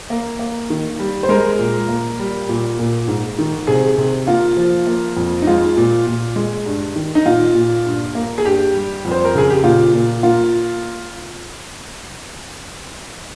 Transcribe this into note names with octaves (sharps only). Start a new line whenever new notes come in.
A#3
A#3
D#3
G3
C5
G#3 A#4
A#2
A#3
G3
A#2
A#2
G#2
D#3
C3 G#4
C3
A#3 F4
F3
A#3
F2
D#4
G#3 F4
A#2
A#2
G#3
G2
D#3
D#4
A#2 F4
A#2
G2
A#3
G#4
G2 G4
G3
F2
C5
A#4
C#3 G#4
G4
A#2 F4
A#2
A#3 F4